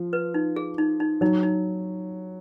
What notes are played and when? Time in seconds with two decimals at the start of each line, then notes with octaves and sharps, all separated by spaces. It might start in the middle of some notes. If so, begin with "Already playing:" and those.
Already playing: F3
0.13 B4
0.34 D#4
0.56 G#4
0.78 D#4
1.00 D#4
1.21 F#3 D#4
1.43 D#4